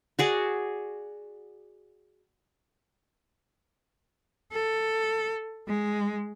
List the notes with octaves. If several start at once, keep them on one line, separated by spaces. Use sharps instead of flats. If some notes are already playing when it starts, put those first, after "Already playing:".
F#4 G#4 D5
A4
G#3